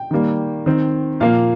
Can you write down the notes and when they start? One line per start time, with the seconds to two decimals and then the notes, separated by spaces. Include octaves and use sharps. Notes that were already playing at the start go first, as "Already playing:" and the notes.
Already playing: G5
0.11 D#3 G3 A#3
0.66 D#3 C4
1.20 A#2 F3 A#3 F5